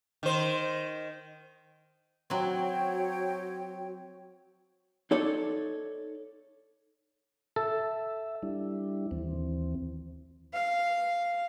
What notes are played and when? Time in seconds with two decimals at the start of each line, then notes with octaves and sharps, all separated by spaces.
0.23 D#3 C5
2.30 F#3 C4 F#4 C#5 G5
5.11 D#4 A4 C#5 D5
7.56 A4 E5
8.43 G3 D4 E4
9.11 D#2 E3 C4
10.53 F5